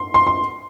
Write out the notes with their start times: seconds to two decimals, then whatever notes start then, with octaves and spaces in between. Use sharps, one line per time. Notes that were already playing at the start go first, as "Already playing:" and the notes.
Already playing: C6
0.14 C6
0.27 C6